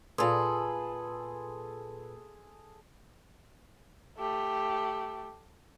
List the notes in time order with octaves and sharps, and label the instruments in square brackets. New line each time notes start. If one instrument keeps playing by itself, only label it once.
[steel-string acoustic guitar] A#2 B4 [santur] G#4 A4 C6
[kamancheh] A3 G4